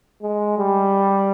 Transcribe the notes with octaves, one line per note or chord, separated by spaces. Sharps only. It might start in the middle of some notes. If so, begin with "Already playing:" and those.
G#3
G3